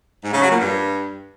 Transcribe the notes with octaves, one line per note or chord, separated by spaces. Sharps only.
G#2
C#3
F#3
A#2
G2